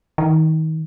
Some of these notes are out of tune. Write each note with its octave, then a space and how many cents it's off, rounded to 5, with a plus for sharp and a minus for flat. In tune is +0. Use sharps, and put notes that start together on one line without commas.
D#3 +30